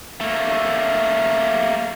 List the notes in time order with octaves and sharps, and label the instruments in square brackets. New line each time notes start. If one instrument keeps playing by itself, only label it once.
[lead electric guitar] A3 A#3